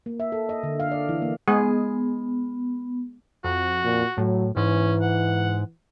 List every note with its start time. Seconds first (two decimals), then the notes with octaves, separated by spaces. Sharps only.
0.06 A#3
0.20 E5
0.32 A4
0.49 D#5
0.63 D3
0.80 F5
0.91 D5
1.09 E3
1.22 A#3
1.48 G#3 B3 G#4
3.44 F2 F#4
3.84 A#2
4.18 A2 F#3
4.56 G#2 E3 C#4
5.01 F#5